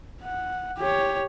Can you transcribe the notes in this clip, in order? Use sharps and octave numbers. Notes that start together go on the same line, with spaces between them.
F#5
G4 C#5